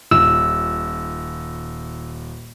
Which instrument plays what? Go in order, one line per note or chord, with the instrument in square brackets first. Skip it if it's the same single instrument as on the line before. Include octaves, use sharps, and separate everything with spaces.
[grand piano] D#1 [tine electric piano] E6